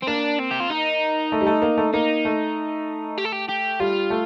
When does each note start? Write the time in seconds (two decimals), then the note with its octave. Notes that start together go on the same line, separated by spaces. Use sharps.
0.03 C4
0.07 A#3 D4
0.39 C4
0.51 G4
0.60 F4
0.70 D#4
1.32 A3
1.41 G3
1.47 A3
1.62 A#3
1.77 A3
1.93 A#3 D#4
2.25 A3
3.18 G4
3.25 A4
3.32 G4
3.48 G4
3.80 G3 F4
4.10 A3